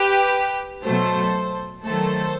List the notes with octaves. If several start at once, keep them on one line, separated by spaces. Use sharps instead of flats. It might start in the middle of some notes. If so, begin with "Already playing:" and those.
Already playing: G4 B4
B2 F#3 A3 A4 C5
D#3 F#3 A3 A4 C5